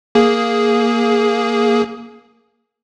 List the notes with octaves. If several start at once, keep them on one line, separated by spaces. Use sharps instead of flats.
A#3 G#4